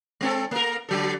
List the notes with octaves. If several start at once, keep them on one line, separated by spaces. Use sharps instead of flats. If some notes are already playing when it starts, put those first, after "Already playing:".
G#3 C4 A4
A#3 A#4
D3 F#3 A4